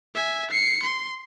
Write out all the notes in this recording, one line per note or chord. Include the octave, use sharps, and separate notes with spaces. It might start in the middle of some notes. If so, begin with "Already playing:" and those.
E5 G#5
C7 C#7
C6